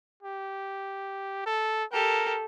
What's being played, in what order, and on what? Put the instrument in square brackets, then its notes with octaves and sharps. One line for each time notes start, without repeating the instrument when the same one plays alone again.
[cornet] G4
A4
[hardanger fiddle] G4 A4 [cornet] A#4